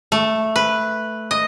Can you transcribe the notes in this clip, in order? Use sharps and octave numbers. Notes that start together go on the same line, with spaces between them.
A3
B4
D#5